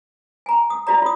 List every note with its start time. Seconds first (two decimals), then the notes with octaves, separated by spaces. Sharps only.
0.46 G#5 A#5
0.70 D#6
0.87 E4 F#4 D5 A#5
1.02 F4 D#6